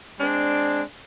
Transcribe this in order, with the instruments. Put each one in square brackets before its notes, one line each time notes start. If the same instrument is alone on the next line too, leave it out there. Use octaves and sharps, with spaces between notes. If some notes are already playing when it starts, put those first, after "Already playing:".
[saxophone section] G#3 C4 D4